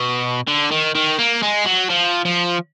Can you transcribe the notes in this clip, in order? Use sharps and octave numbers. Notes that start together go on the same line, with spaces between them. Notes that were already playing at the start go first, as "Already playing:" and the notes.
Already playing: B2
D3
D#3
D#3
A#3
G#3
F#3
F3
F3